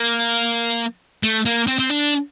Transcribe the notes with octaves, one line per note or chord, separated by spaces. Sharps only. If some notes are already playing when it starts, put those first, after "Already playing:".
Already playing: A#3
A3
A#3
C4
C4
D4